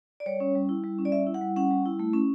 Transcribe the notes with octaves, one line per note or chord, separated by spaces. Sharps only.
D5
G3 C#5
C#4
G3
E4
G3
C#4
D5
G3 E5
E4
F#5
G3
C#4 F#5
G3
E4
A3
C#4